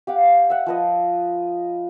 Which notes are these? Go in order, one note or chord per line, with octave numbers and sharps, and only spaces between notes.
G4 F5 F#5
E5 F#5
F3 B4 D#5